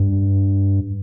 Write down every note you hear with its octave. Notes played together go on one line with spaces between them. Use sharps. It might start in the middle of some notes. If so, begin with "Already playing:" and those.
Already playing: G2